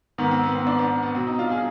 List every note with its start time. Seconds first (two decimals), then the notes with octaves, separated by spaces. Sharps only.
0.18 G#2 D#3 B3
0.31 C4
0.43 B3
0.55 C4
0.67 B3 D4
0.79 B3 D4
1.03 B3
1.15 B2 C4
1.27 C4 D#4
1.39 D4 F4
1.50 F4 G#4